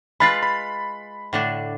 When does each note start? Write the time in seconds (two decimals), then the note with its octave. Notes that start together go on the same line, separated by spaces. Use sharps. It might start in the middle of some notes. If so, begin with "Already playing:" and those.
0.20 G#3 F4 B4 B5 A6 C7
0.43 B5
1.33 A2 D3 D4